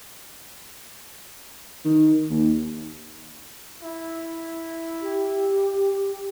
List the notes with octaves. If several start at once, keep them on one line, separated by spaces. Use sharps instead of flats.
D#3
D#2
E4
G4